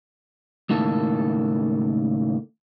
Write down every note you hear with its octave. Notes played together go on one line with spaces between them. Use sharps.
C#2 A2 D#3 A#3 A4